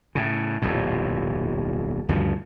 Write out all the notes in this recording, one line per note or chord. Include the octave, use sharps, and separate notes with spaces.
A2 C#3
D#1 B1 F2 A2
D2 G2 C#3 F3